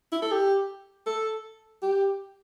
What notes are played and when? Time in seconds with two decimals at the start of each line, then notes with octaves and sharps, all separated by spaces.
0.12 E4
0.22 A4
0.31 G4
1.06 A4
1.82 G4